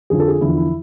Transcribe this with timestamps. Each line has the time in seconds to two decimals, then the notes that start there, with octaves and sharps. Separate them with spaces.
0.10 F2 D3 F3 G#4
0.20 A4
0.28 G#4
0.41 E2 D3 F3 E4
0.57 E4